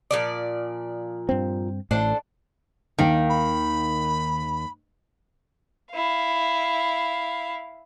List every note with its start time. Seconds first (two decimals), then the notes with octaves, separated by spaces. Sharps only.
0.11 A#2 F3 D5
1.29 G2 C4
1.91 A1 A2 D4 A4 C5
2.98 D#2 D#3 F5 G5
3.29 B5
5.91 E4 F5